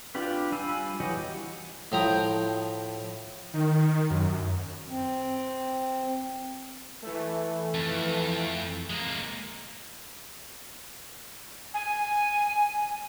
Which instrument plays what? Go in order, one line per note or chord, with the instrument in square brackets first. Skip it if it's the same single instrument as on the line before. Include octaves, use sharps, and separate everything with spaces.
[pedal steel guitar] D4 F4 G4 B4
G3 F5 G#5 B5 E6
E3 F#3 G4 D#5 F#5
[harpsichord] A2 F3 C5 G5 A#5 D#6
[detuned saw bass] D#3
D#3
F#2
[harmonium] C4
[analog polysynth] E3 A3
[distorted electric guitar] F2
G#3 A#3
[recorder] G#5